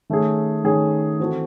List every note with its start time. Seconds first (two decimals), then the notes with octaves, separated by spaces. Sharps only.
0.09 D#3 A3 C#4 G#4
0.64 D#3 A3 C#4 G#4
1.20 E3 C4 F#4 A4